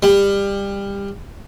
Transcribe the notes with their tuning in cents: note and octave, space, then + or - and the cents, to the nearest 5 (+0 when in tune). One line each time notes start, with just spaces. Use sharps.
G3 +25